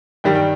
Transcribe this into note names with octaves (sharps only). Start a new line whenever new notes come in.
G2 D#3 G3 G5
G5